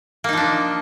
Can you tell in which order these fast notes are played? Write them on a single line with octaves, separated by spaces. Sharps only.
A#3 D#4 F3 D4